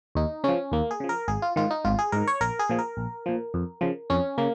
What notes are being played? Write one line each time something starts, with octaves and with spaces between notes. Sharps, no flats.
D#2 D#4
C#3 F3 C#4
D#2 A#3
G#4
C#3 F3
A#4
G#1 G#4
F4
G#2 D#3 F4
D#4
G#1 F4
G#4
G#2 D#3 A#4
C#5
A#1 A#4
G#4
A#2 F3
A#4
A#1
A#2 F3
F2
C#3 F3
F2 C#4
C#3 A#3